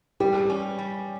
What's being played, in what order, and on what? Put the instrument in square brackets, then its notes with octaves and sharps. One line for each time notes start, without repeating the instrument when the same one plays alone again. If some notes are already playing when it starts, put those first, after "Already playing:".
[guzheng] G3 [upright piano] G4
[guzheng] C#4
G3